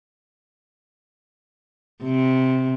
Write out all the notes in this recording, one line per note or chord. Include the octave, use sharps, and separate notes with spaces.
C3